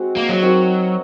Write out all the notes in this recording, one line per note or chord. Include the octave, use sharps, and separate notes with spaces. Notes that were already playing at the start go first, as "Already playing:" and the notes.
Already playing: G#3 C4 F#4
A#3
F#3
C4 D#4 F#4 A#4